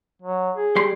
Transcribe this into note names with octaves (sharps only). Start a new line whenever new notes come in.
F#3
G#4
G3 C6